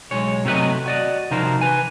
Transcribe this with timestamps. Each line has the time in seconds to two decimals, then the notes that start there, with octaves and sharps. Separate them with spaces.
0.11 B1 G#3 C#5
0.45 C3 F#3 A3 D#4 B4 D#5
0.86 F#4 D5 D#5
1.31 C3 F3 D#4 F#4 A#4 C5
1.61 B4 G#5